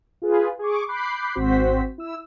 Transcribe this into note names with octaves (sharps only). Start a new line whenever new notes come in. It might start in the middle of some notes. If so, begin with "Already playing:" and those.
F4 G#4 B4
G#4 C#6 D6
B5 D6 F#6 G6 C7
G#1 C4 F#4 C5 B6
E4 E6